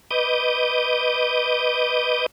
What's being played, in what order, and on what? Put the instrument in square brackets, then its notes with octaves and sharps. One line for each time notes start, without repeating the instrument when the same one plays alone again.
[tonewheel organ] B4 D#5 D6 D#6 G6